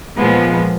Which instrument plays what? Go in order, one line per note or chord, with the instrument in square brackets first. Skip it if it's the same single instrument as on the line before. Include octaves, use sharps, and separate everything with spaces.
[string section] A#2 F3 G#3 B3